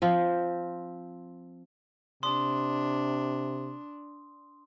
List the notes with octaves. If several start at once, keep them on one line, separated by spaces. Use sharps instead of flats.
F3 C4
C3 D4 C6 D#6